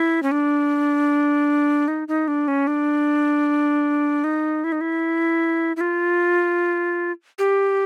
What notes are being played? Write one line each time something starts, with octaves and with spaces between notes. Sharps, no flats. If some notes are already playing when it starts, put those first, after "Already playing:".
Already playing: E4
C#4
D4
D#4
D#4
D4
C#4
D4
D#4
E4
D#4
E4
E4
F4
G4